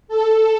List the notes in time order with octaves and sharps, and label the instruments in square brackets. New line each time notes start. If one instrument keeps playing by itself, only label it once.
[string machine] A4